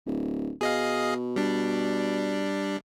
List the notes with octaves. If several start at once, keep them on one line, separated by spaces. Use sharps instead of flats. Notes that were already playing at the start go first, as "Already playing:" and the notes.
D1
B2 G#4 D#5 F5
G3 D4